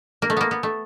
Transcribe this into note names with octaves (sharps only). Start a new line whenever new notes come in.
A#3
A3
A#3 B3
B3
A3